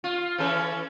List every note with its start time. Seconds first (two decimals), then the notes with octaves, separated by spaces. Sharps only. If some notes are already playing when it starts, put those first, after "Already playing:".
0.04 F4
0.38 E3 C#4 A4